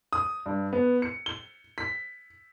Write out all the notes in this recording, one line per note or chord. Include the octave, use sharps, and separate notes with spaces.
D#6
G2
B3
C#7
G7
B6